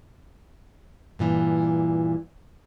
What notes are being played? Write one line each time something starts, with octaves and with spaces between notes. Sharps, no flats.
G2 A#2 E3